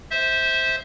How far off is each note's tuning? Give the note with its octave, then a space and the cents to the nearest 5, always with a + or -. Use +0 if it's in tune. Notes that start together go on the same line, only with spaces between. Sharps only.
C5 +0 E5 -20